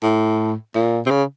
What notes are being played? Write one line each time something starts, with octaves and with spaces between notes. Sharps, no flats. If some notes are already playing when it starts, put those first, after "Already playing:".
A2
A#2
C3
C#3